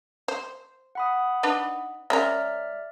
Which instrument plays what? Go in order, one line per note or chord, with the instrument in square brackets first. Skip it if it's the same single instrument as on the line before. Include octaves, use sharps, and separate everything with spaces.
[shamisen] C5
[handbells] F#5 B5 D#6
[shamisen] D4 D#4 B4
[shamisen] G#3 C#4 A#4 [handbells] D5 E5 F6